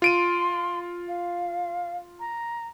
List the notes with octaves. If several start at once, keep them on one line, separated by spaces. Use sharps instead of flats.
F4 C6 D7 D#7
F5
A#5